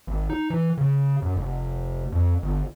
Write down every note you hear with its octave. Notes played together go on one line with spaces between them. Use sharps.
G#1
D#4
E3
C#3
F#2
F1
F2
G1